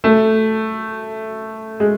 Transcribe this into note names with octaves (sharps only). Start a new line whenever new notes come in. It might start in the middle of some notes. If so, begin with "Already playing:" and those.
A3
G#3